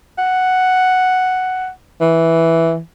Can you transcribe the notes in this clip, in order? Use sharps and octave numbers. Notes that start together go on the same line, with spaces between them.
F#5
E3